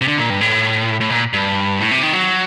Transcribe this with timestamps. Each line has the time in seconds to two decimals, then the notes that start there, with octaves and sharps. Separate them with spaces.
0.01 C3
0.07 D3
0.18 A#2
0.30 G2
0.41 A2
1.00 A2
1.10 A#2
1.33 G2
1.79 A2
1.91 C3
2.03 D#3
2.13 F#3